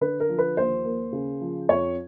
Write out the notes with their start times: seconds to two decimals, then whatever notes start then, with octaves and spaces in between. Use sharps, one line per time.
0.01 D3 B4
0.20 A#4
0.29 F3
0.39 B4
0.57 D#2 C5
0.85 A#3
1.13 C#3
1.41 F3
1.69 F2 C#5